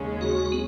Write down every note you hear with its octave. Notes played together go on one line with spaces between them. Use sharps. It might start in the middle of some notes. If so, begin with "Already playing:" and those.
Already playing: D#2 C#3 G#3 C#4
F#4
B3